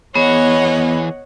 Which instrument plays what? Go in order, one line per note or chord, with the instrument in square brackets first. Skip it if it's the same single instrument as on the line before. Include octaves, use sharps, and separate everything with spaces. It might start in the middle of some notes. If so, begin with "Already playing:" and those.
[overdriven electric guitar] E3 G#4 [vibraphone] B3 [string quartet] C#5 D#5 F#5